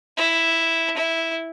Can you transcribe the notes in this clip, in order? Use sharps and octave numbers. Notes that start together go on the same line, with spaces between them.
E4
E4